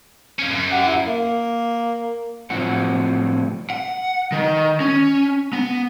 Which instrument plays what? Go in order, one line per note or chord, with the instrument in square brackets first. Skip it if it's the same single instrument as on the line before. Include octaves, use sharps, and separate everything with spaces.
[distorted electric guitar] C#4 F4
F#2
[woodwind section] G4 F#5
E4
[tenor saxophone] A#3
[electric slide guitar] A2 C3 F3 F#3 C4 F#5
[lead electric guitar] F#5
D#3
C#4
B3